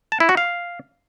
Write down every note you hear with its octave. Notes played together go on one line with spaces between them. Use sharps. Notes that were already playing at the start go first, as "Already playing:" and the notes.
A5
E4
F#4
F5